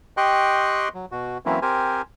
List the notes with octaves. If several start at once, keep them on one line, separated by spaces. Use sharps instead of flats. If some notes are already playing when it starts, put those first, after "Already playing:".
G4 D#5 G5 C6 C#6 F#6
F#3
B2 F#4
E3 F#3 A#3 C4 C#4 E4
C4 G4 A#4 C5 G#5